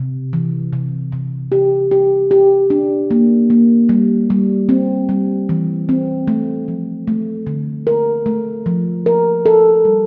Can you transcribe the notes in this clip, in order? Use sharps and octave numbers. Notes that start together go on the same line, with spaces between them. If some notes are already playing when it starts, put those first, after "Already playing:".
Already playing: C3
E3
C3
C3
G4
G4
G4
D4
A#3
A#3
G3
G3
C4
G3
E3
C4
A3
F3
A3
D3
A#4
A3
F3
A#4
A4
G3